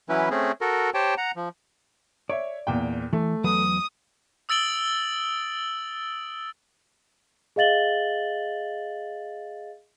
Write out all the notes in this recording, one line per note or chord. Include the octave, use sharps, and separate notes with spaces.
E3 F#3 C#4 E4 B4
A3 C4 C#4 G#4
F#4 A4 A#4
G4 C5 C#5 G5 A5
F#5 A#5
F3
C#5 D5 E5
E2 A#2 G5
E3 A3
E2 F#3 B4 D#6
D#6 E6 A6 D7 F#7 G7
G#4 D#5 F5 A6 F#7 G7